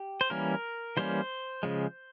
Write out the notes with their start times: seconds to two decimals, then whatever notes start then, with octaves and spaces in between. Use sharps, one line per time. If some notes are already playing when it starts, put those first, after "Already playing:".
Already playing: G4
0.21 C5
0.30 E3 G3 A#3 C#4 A#4
0.97 E3 G3 A#3 C#4 C5
1.63 C#3 F3 G#3